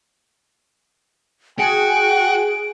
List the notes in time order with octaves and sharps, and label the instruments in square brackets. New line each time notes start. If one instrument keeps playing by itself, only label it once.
[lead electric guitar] F#4 [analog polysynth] G#4 [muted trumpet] G5 [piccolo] D7